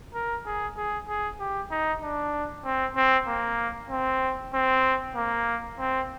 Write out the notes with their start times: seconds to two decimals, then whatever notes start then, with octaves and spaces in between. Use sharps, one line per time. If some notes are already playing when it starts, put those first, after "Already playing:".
0.14 A#4
0.46 G#4
0.77 G#4
1.08 G#4
1.40 G4
1.71 D#4
2.02 D4
2.65 C4
2.96 C4
3.27 A#3
3.90 C4
4.54 C4
5.16 A#3
5.79 C4